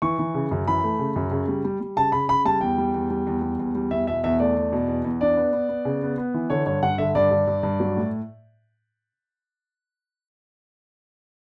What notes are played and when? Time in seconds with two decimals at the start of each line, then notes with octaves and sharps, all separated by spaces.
0.02 E3 C#6
0.19 E3
0.34 C#3
0.51 F#2
0.68 E3 B5
0.84 A3
0.99 C#3
1.16 F#2
1.31 C#3
1.48 G3
1.64 G3
1.80 G3
1.96 C#3 A5
2.12 C#3 B5
2.28 C#3 B5
2.45 G3 A5
2.61 E2 G5
2.78 G3
2.94 E2
3.10 G3
3.27 E2
3.42 G3
3.59 E2
3.75 G3
3.91 E2 E5
4.07 B2 E5
4.23 E2 E5
4.40 A3 D5
4.56 E2
4.72 B2
4.88 E2
5.04 E2
5.21 D4 D5
5.37 B3
5.53 B3
5.69 B3
5.85 C#3
6.02 B3
6.18 B3
6.34 E3
6.50 D3 C#5
6.66 G2 C#5
6.83 G2 F#5
6.98 D3 E5
7.15 G2 D5
7.31 G2
7.47 G2
7.63 G2
7.80 F#3
7.97 A2